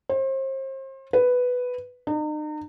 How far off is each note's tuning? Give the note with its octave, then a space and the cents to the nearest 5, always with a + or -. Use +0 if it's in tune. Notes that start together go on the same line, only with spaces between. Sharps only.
C5 +35
B4 +5
D#4 -40